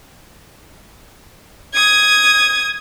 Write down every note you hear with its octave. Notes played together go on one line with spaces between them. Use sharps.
D#6 G#6